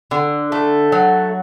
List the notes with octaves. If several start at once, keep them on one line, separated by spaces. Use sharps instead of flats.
D3
A3
F#3